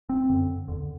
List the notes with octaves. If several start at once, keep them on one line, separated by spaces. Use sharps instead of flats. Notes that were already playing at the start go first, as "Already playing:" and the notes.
C4
F#2 D3
E2 D3